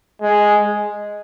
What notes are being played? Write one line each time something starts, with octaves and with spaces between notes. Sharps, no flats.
G#3